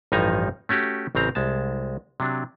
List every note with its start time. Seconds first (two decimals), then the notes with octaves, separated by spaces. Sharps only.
0.12 A1 G2 F3 D#4 G#5 A#5
0.69 A3 C#4 F#4 G4
1.15 A1 C#3 C4 A#5
1.35 C2 G#3 A5
2.20 C3 F#3 D4